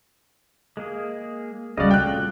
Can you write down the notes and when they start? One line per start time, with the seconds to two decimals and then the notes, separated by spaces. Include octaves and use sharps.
0.77 G#3 A#3 G#4
1.78 C#3 F#3 G3 F#4 D5 D#5 F5 F#5
1.91 A#1 A3 C4 F4 G5 F#6